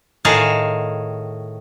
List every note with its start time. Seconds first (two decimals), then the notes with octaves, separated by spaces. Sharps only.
0.25 A2 D#3 F#4 G#4 F5 A5